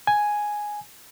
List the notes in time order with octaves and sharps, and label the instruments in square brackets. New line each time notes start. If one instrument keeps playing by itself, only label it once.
[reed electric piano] G#5